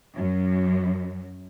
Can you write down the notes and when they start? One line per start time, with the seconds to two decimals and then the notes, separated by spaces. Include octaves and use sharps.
0.16 F#2